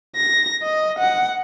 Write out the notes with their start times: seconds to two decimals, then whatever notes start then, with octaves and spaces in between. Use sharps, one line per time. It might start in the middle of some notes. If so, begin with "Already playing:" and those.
0.16 A#6
0.62 D#5
0.98 F#5